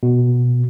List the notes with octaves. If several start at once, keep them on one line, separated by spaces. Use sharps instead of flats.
B2